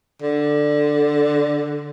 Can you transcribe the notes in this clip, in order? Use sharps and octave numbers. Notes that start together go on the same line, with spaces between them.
D3